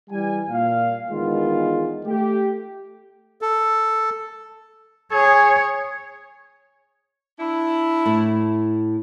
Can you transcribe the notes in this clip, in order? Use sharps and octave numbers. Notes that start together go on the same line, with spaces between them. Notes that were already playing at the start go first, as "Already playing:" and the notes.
E3 G3 G#5
A#2 F5
E2 D#3 G#3 B3 F4
A3 G4
A4
G#4 C#5
D4 E4
A2